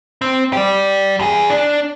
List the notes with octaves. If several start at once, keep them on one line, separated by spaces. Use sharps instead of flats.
C4
G4 D5
E2 G#4
D4